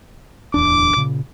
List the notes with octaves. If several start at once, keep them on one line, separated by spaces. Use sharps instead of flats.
D1 E2 D4 D6
A#2 C#3